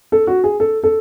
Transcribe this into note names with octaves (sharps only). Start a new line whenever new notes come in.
A4
F#4
G#4
A4
A4